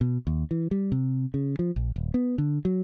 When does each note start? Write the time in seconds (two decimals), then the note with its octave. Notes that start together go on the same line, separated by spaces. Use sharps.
0.01 B2
0.27 D#2
0.51 E3
0.71 G3
0.92 C3
1.34 C#3
1.59 F3
1.76 A#1
1.96 D#1
2.14 B3
2.38 D3
2.65 F#3